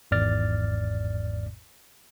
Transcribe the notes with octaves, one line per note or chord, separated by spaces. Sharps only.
G#1 E2 G#2 D5 F6 A6